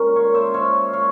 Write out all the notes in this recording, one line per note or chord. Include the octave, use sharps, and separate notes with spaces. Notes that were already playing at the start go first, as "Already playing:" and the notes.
Already playing: A#2 G#3 C#4 A#4
C#5 F5
C5 E5
C#5 F5
C#5 F5